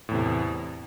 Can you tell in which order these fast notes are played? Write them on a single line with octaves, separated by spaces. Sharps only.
A2 E2 C3